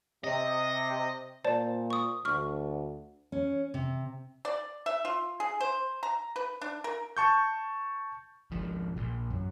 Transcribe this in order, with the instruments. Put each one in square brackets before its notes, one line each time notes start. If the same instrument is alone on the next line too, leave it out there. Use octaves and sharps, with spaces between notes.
[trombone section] C3 [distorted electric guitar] D#5
[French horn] A#2 [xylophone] C5 D5 A5
[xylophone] C#6 D#6
[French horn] D2 [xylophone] C#6 F6
[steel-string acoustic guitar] C#4
C3
[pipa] D5
E5
F4
G#4
C5
A#5
B4
D4
A#4
[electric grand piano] A5 C#6 G6
[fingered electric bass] G#1 F3
A#1
F#2